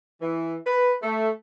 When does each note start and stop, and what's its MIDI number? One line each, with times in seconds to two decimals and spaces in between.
0.21 0.56 52
0.66 0.94 71
1.02 1.29 57